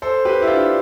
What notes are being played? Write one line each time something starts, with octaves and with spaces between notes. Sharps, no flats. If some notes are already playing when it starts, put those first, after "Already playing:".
A4 C5
G4 B4
E4
D4 F4